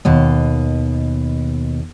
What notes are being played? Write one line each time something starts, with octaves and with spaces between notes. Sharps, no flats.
D#2 B2 D#5